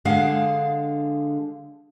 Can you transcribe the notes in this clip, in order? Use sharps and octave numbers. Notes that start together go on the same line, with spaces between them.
D3 G#3 D4 G#4 F5 F#5